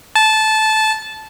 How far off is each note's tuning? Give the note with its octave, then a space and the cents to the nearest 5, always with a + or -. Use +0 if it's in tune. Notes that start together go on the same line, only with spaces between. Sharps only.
A5 -15